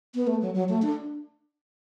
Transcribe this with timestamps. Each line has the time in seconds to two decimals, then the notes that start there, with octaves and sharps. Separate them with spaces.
0.15 B3
0.27 A3
0.42 F#3
0.54 F#3
0.69 A3
0.82 D4